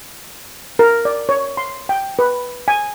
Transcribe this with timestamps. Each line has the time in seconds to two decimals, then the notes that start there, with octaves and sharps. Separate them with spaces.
0.79 A#4
1.05 D5
1.29 C#5
1.57 C6
1.89 G5
2.19 B4
2.68 G#5